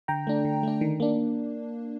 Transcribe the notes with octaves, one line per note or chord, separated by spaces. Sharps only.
D3 G5 A#5
A3 D4
D3
A3 D4
D#3
A#3 D4